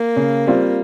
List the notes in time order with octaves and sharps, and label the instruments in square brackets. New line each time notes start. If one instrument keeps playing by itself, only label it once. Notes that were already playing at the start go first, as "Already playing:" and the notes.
Already playing: [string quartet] A#3
[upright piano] C#3
G3 C4 F4